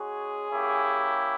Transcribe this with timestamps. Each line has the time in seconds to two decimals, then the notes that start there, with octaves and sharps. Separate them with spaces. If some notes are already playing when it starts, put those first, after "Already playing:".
Already playing: G#3 C#4 F#4 G#4
0.52 A#3 C#4 E4 G4